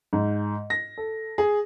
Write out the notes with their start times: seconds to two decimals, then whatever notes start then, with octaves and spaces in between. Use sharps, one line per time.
0.13 G#2
0.70 A#6
0.98 A4
1.38 G#4